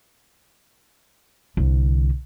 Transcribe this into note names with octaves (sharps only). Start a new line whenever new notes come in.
C2 D3